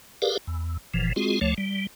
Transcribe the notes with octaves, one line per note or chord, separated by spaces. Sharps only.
G4 G#4 A#4 B4 D5 F5
E2
F#1 A#2 E3 F3
G#3 C4 F4 F#4 G#4
D2 F3 A3 C#5
G3